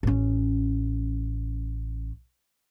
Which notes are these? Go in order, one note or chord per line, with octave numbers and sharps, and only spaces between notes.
A1 C#4